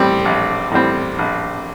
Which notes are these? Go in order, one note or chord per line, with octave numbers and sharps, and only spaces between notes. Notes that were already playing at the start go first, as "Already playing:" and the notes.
Already playing: A2 G3 C4
A#1
A2 G3 C4
A#1